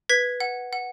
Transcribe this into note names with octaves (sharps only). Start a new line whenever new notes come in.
B4 G#6 B6
F#5
F#5